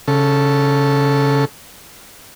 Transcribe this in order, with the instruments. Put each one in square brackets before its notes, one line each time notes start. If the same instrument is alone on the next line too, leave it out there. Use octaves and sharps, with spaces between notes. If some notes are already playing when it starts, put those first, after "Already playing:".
[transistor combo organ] C#3 A4